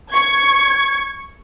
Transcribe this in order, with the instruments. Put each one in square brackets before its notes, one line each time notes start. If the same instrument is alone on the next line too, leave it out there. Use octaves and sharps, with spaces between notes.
[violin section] C#6 G#6